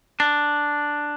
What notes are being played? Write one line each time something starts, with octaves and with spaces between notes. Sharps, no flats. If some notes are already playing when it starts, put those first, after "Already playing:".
D4